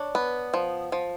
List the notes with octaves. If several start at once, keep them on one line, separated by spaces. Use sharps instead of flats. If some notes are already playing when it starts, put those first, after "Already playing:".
Already playing: D4 C#5
B3
F3
F3